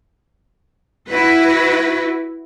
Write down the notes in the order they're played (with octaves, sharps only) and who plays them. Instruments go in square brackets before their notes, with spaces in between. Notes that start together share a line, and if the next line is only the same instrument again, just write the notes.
[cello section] E4 F#4 B4